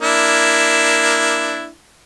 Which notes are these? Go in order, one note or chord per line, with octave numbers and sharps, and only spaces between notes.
A#3 D4 E4